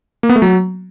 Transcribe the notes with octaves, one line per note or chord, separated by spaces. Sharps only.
A#3
B3
A3
F#3